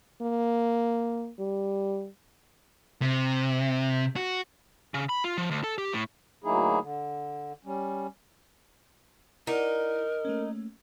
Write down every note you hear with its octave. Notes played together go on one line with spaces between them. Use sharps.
A#3
G3
C3
F#4
C#3
B5
F4
F3
D2
A4
G4
A2
D2 F#3 A#3 D#4 E4 G#4
D3
G3 C#4
D#4 E4 A#4 D5 F#5
A3 A#3 C#4